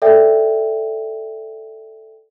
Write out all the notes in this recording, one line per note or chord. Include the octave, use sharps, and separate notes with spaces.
A4 D5 E5 G5